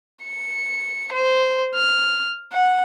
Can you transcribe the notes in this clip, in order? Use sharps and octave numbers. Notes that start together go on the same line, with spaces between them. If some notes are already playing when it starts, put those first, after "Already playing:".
C#7
C5
F6
F#5